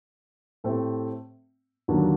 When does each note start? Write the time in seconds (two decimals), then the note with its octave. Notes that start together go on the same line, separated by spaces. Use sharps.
0.64 A2 A3 C4 G4
1.88 D#2 D3 F#3 A#3 D4